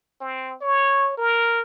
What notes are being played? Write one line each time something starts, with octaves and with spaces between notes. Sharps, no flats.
C4
C#5
A#4